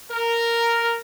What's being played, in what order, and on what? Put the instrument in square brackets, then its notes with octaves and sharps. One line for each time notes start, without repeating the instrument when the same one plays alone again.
[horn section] A#4